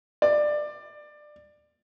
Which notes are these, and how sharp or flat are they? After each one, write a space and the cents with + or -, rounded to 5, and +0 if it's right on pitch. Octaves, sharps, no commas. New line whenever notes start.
D5 +20